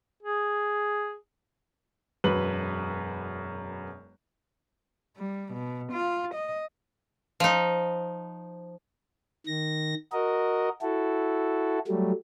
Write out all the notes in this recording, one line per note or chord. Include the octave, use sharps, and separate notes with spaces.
G#4
E1 F#2 B4 F#7
G3
B2
F4
D#5
F3 D#4
D#3 A#6
F#4 A#4 D#5
E4 F#4 A4
F#3 G3 A3